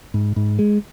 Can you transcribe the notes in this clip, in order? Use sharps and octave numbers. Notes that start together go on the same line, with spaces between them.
G#2
G#2
G#3